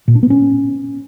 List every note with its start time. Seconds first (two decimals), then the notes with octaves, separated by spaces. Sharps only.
0.08 A#2
0.15 D4
0.23 B3
0.30 C#4